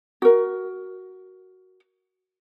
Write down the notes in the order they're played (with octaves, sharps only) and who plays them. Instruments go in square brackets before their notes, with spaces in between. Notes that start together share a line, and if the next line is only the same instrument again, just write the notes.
[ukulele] F#4 A#4